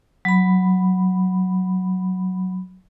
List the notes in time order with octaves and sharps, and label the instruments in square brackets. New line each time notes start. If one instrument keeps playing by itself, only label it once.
[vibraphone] F#3 B5